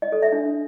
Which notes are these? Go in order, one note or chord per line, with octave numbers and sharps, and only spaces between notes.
D#5
A4
E5
D4